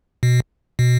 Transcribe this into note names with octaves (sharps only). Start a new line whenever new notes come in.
B2
B2